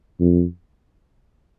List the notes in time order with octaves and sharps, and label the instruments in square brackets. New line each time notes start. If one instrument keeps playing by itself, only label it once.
[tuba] F2